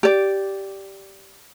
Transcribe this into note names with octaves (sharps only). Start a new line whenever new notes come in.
G4 D5